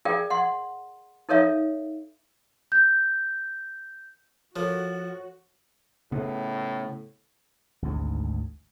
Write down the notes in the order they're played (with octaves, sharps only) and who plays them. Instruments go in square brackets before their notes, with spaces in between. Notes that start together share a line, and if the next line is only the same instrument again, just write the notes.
[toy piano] G#4 A#4 D5 F5 G5
F#5 C6
D#4 A4 A#4 C#5 E5 F5
[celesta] G6
[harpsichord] F3 [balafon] F4 A4 A#4 [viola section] F#4 [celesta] C#5
[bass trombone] A2 [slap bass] C#3 B3
[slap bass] G#1 D2 G#2